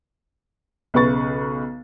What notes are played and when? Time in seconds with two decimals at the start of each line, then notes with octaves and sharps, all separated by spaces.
0.94 B1 C#3 B4 C#6 A6